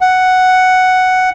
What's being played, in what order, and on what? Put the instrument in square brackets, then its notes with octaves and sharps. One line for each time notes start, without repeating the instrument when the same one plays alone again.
[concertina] F#5